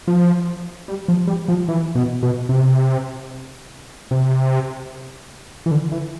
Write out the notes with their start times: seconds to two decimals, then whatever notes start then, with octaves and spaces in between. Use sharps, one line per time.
0.07 F3
0.88 G3
1.08 F3
1.27 G3
1.48 F3
1.68 E3
1.95 B2
2.23 B2
2.49 C3
4.11 C3
5.66 E3
5.71 D3
5.92 E3